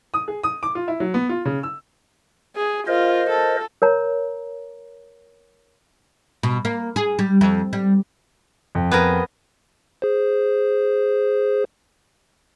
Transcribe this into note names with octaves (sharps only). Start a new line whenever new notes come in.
D#6
G#4
D#6
D6
F4
E4
F#3
B3
F4
C#3
E6
G#4
F4 A#4 C5 D#5
A4
A#4 C#5 A#5
B2
A#3
G#4
G3
F2
G3
F2
B3 G#4 A#4
G#4 C5